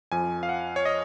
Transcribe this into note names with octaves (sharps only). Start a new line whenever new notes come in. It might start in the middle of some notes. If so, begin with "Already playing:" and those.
F2 F3 G#5
F5
F#5
C#5
D#5